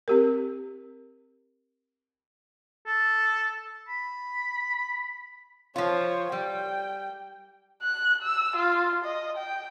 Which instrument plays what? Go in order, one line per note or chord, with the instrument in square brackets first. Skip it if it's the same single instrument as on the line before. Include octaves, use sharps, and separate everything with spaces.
[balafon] C4 G4 A#4
[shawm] A4
B5
[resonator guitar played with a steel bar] F3 F4 [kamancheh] C5 C#5
[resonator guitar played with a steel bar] G3 [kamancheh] G5
[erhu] F#6
E6
F4
D#5
G5